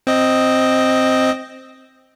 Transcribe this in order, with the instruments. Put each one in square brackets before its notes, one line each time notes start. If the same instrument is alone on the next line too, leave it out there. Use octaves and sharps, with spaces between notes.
[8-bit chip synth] C4 D#5